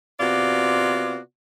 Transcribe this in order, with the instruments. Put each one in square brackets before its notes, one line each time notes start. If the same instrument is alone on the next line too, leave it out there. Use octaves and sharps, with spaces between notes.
[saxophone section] C3 B3 F4 F#4 D5